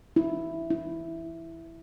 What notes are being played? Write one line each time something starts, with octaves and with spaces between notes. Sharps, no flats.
E4
E4